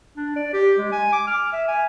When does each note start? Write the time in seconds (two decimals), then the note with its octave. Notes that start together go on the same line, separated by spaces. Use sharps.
0.17 D4
0.36 D5
0.54 G4
0.79 G#3
0.92 G#5
1.13 D6
1.27 F6
1.53 E5
1.68 G#5